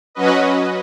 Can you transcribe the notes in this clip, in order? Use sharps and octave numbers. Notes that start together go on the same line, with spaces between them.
F#3 C#4 F#4 B4 D#5